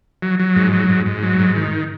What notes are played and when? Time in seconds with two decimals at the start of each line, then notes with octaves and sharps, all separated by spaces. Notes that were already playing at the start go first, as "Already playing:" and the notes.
0.22 F#3
0.40 F#3
0.56 G#2
0.73 F#3
0.89 G#2
1.06 G#2
1.23 F#3
1.39 G#2
1.56 D#3